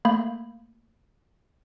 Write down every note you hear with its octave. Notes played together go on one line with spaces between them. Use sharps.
A3 A#3 B5 G6